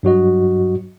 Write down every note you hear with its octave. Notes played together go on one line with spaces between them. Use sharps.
G2 F#3 F#4 D#5